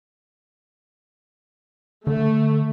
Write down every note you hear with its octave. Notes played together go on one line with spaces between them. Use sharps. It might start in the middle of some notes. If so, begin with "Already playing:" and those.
D3 A3